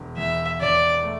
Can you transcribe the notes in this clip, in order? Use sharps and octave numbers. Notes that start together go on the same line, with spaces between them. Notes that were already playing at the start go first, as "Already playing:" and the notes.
Already playing: E1
E2 E5
E1 D5
A3